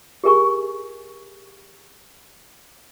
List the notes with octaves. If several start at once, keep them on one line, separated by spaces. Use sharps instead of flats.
G4 G#4 A#4 G#5 C#6